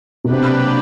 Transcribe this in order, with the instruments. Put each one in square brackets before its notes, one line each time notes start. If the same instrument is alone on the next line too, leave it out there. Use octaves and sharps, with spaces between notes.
[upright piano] B2
[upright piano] C3 [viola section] F#3 A#3 D4 G4 B4